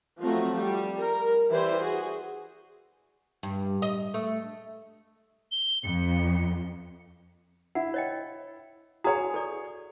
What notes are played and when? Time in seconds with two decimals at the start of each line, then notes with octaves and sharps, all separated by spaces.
0.20 F3 F#3 A3 C4 F4 F#4
0.58 G3 G4
0.99 A#4
1.50 E3 E4 G4 B4 C5 D5
1.80 F#4 G#4
3.43 G2
3.82 D#5
4.14 A3
5.51 G7
5.83 F2 C#7
7.75 E4 F#5
7.94 C#5 D#5 G5
9.04 F#4 G#4 C#5 A#5 D#6
9.34 A4 D5